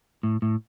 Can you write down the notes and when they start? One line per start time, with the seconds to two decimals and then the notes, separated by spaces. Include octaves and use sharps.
0.23 A2
0.42 A2